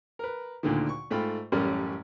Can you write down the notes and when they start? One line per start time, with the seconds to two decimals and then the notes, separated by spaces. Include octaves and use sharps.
0.19 A#4 B4
0.63 D2 A#2 D3 D#3
0.89 C#6
1.11 G#2 A3 F4 G5 B5
1.52 A1 F#2 G3 C#4 A4 A#4